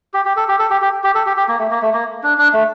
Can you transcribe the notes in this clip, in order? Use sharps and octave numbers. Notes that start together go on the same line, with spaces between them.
G4
G4
A4
G4
A4
G4
G4
G4
A4
G4
G4
A#3
A3
A#3
A3
A#3
D4
D4
A3